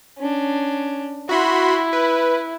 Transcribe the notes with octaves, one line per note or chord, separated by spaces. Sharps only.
C#4 D4
E4 F#4 B5 C6
B4